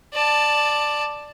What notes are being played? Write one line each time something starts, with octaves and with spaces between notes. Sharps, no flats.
D5 A5